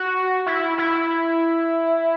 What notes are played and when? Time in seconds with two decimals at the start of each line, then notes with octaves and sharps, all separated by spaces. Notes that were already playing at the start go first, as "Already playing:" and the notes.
Already playing: F#4
0.46 E4
0.78 E4